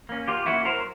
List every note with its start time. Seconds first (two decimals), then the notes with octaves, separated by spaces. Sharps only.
0.09 A#3 C#4
0.28 F#3 F4 G4
0.46 A#3 C#4 E4 F#4
0.65 F#3 A#4 C5